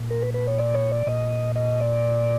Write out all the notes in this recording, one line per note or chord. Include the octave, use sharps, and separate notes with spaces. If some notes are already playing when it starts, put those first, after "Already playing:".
Already playing: A#2
A#4
B4
B4
C#5
D5
C#5
D5
A#2 D#5
D#5
D5